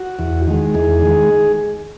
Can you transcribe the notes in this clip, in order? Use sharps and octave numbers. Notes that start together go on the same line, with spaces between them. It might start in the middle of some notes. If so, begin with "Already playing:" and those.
Already playing: F#4
E2
D#3 G#3
E2 G#4
D#3 G#3